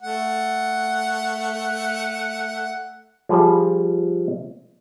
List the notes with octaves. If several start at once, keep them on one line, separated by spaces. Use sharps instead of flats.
A3 F#5
F3 G3 G#4